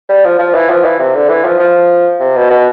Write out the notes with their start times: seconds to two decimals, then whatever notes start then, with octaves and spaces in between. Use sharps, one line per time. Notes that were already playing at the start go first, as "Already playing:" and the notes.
0.09 G3
0.25 F3
0.39 F3
0.54 E3
0.69 F3
0.84 E3
0.99 C3
1.15 D3
1.29 E3
1.45 F3
1.59 F3
2.20 C3
2.36 B2
2.50 B2